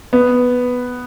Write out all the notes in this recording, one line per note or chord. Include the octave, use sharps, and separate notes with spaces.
B3